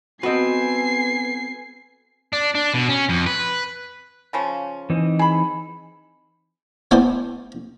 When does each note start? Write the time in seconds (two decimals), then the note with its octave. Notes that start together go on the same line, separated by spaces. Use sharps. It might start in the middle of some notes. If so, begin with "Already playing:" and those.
0.23 B3 C4 F#4 A4 B4 D#5 G#5 C7
2.33 D4
2.55 D4
2.74 B2
2.89 C#4
3.09 F2
3.26 B4
4.33 C#3 F3 C#4
4.90 E3 C4 D#4
5.19 G#4 B5
6.91 A3 B3 E4 C5 D5 G#5